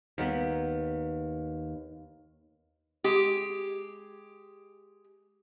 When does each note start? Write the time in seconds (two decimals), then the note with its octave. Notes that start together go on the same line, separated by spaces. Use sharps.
0.18 D#2 B3
3.04 G#3 G4